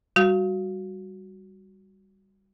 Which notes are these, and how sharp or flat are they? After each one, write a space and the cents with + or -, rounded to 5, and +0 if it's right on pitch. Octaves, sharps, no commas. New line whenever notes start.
G3 +0 F#4 +0